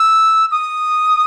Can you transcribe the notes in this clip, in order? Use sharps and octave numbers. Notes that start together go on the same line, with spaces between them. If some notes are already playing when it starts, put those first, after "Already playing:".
Already playing: E6
D#6